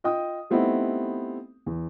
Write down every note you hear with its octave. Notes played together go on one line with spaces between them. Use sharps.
F4 D#5 G5 D#6
G3 A3 B3 C4 D#4 E4
E2